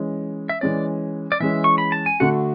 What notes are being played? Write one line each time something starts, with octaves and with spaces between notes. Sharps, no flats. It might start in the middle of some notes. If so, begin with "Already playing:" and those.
Already playing: E3 G#3 C#4
E5
E3 G#3 C#4 D5
D5
E3 G#3 C#4 E5
C#6
B5
A5
G#5
D3 A3 D4 F#4 F#5